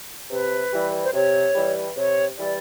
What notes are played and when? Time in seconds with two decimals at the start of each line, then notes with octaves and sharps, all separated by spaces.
0.30 C3 B4
0.72 E3 G3
1.04 C5
1.14 C3 C#5
1.55 E3 G3
1.96 C3 C#5
2.37 E3 G3 D5